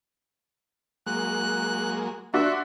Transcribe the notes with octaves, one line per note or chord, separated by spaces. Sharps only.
F#3 G#3 A#3 F#6
D4 F#4 E5 C6